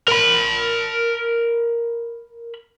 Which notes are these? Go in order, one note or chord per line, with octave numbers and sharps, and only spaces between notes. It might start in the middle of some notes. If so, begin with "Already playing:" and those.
A#4 B5